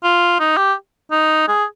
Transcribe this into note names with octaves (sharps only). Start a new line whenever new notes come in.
F4
D#4
G4
D#4
G#4